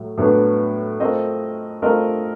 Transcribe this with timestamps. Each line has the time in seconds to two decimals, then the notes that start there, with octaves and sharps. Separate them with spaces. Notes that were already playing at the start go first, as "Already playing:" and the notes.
Already playing: A2 F#3
0.18 A2 F#3 B3 D4
1.00 A3 C4 F4 A#4 D#5
1.82 A3 C4 F4 A#4 D#5